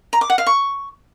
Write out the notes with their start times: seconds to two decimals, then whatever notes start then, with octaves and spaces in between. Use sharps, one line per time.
0.13 A#5
0.21 D6
0.30 F#5
0.38 F5
0.46 C#6